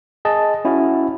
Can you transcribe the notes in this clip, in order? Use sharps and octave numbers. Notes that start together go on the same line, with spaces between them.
G#4 D#5 A5
C#4 E4 F#4